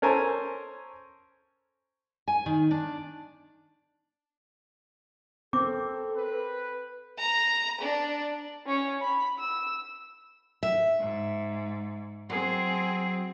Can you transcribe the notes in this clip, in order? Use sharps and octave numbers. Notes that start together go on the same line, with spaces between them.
C#4 A4 A#4 C5 G#5 A5
G#5
D#3
D4
C4 A4 A#4 D6
B4
A#5
D4
C#4 C#5
B5
E6
E5
G#2
F#3 C4 G#4